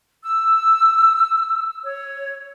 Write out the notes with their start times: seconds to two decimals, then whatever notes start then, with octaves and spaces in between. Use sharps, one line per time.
0.23 E6
1.84 C#5